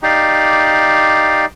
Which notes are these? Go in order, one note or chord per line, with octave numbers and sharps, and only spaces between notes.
D#4 G4 D5 F5